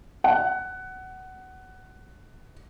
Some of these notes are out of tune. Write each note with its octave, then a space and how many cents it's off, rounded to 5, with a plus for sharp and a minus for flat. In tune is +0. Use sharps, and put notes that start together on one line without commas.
F#5 +15